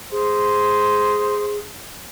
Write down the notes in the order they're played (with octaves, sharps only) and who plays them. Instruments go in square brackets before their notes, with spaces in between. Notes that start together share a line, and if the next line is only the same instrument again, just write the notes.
[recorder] G#4 [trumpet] C5